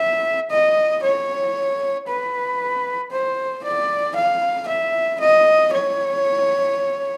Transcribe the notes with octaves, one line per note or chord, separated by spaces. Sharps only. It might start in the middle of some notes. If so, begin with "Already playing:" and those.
Already playing: E5
D#5
C#5
B4
C5
D5
F5
E5
D#5
C#5